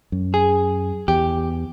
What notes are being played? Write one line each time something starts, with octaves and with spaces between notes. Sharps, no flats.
F#2
G#4
E2 G4